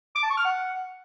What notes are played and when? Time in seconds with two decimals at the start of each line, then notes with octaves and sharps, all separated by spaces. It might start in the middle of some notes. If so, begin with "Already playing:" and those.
0.15 D6
0.23 A5
0.30 C#6
0.37 F6
0.44 F#5